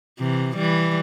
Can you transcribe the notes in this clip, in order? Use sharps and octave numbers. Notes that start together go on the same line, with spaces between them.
C3 E3
E3 G3